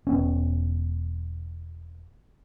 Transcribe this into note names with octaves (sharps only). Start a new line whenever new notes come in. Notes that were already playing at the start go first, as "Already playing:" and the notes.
E1 B3 C#4